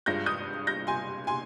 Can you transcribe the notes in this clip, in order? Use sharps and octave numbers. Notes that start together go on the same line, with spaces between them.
G#1 G2 F3 G#3 G6 A#6
D#6 G6
G6 A#6
G#5 C6
G#5 C6